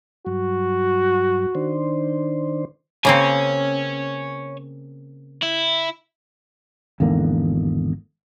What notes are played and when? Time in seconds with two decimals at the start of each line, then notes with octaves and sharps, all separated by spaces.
0.27 G2 F#3 F#4
1.55 D#3 D4 C5
3.05 C#3 A#3 C4 C#5 G#5
5.43 E4
7.00 G#1 E2 D3 A#3